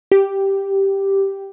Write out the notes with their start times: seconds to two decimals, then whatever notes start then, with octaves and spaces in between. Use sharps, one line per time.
0.12 G4